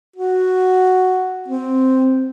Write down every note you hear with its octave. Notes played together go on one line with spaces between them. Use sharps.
F#4
C4